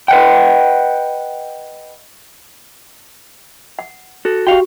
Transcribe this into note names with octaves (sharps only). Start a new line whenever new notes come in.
B4 D#5 F#5 G5
F#5
F#4 A4
F#4 G4 F5 G5